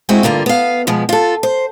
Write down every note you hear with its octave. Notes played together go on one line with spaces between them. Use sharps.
G#3 A3 C4 E4 F#4
G2 D3 A#3 F4
B3 F5
B2 F3 G#3 B3
F4 A4
C5